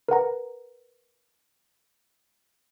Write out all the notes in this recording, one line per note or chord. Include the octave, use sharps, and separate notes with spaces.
A#4 B4 F#5 A#5